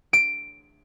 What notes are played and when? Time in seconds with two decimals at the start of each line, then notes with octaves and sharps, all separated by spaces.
0.13 D7